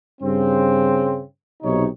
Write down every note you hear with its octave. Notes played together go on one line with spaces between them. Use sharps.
G2 C#3 C4
B1 C3 D#4 C#5